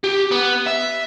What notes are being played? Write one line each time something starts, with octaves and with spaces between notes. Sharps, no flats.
G4
B3
E5